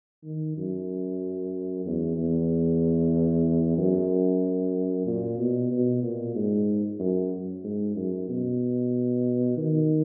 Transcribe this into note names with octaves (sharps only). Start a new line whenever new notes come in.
D#3
F#2
E2
E2
F#2
A#2
B2
B2
A#2
G#2
F#2
G#2
F#2
B2
D#3